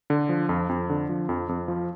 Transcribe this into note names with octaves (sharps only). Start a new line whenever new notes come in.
D3
F3
F2
F2
D3
F3
F2
F2
F3